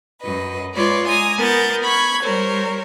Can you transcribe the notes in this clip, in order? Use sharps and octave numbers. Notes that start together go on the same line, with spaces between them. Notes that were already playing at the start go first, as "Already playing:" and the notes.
F#2 B4 D#5
G#3 F4 B4 C#5 D5
G#5 A#5 D#6
B3 A#4 G6 A6
B5 C#6 G#6
G3 A#4 C5 C#5